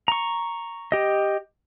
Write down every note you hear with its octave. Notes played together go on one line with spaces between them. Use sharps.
A#5 C#6
G4 D#5